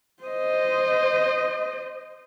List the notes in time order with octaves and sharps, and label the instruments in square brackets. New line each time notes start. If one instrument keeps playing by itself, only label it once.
[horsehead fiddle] C5 D#5